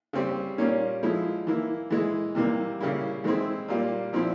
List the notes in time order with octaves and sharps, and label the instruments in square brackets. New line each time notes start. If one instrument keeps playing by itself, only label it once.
[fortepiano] C#3 G3 C4
A#2 G3 A#3 C#4
F3 G#3 E4
E3 A#3 E4
E3 G#3 E4
C3 E3 G3 A#3
C#3 G3 A#3 E4
E3 G#3 C4 E4
A#2 G3 A#3 F4
A#2 F3 C4 E4